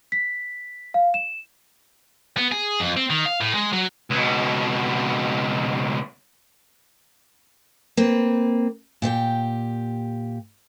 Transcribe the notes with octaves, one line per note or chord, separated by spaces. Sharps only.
B6
F5
E7
B3
G#4
F2
C4
D#3
F5
A2
G#3
F#3
C#2 B2
A#3 C4 B4
A#2 G4 C#5 G5